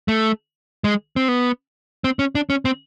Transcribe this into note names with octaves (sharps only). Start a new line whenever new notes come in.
A3
G#3
C4
B3
C4
C#4
D4
C#4
C4